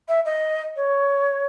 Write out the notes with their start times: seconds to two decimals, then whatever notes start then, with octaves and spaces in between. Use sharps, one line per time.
0.08 E5
0.25 D#5
0.76 C#5